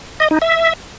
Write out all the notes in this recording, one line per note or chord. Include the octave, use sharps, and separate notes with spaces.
D#5
D#4
E5